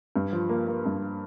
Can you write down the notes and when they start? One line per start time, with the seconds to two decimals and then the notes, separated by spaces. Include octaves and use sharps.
0.16 G2
0.32 F3
0.49 A#3
0.67 A#3
0.85 G2